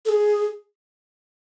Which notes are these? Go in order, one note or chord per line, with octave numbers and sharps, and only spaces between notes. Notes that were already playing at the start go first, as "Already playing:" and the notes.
A4
G#4